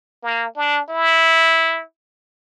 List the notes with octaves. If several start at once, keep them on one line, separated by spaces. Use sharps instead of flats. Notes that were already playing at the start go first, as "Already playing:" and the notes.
A#3
D4
E4